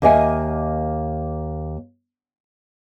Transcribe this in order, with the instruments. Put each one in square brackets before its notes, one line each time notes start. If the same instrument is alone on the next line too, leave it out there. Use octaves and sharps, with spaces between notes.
[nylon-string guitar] D#2 A#3 D#5 E5 G#5